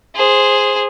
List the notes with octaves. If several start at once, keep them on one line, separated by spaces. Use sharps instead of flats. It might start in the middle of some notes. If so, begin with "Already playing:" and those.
G#4 C5